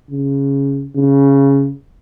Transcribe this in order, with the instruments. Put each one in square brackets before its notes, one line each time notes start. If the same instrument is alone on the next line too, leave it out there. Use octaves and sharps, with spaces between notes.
[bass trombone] C#3
C#3